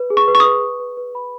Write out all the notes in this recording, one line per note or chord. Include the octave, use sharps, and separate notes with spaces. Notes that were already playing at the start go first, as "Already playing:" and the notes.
Already playing: B4
G#4
C#6
B4
C#6
D#6
B4
B4
B4
B4
B5